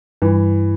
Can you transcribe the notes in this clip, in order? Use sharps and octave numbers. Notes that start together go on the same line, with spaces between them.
G2 E3